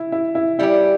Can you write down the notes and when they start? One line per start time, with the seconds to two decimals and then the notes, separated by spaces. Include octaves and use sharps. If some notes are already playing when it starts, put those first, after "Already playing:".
Already playing: E4
0.12 E4
0.35 E4
0.59 G3 C#4 E4 G4